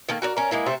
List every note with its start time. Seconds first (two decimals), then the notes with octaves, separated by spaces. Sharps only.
0.09 D#3 A#3 A4
0.22 F#4 A#4 D5
0.37 C#4 A#4
0.51 G#3 A#3 E4
0.66 C3 A3 C5